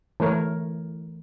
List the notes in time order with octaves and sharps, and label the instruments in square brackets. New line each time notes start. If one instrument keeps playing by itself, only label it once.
[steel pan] E3 A3 A#4 C#5